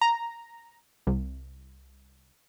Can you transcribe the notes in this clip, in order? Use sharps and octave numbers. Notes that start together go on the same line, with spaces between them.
A#5
C2